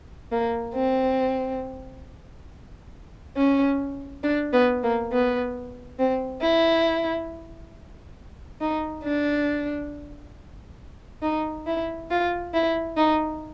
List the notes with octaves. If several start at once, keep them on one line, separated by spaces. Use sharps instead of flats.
A#3
C4
C#4
D4
B3
A#3
B3
C4
E4
D#4
D4
D#4
E4
F4
E4
D#4